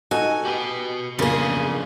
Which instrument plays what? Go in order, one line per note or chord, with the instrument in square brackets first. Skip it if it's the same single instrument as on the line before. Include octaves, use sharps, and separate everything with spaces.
[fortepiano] D#4 F#4 A4 [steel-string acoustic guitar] G#5
[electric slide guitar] F#4 B4 [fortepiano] G4
[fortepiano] F2 A#3 [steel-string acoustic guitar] C#3 G#4 [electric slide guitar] F3 B3 D4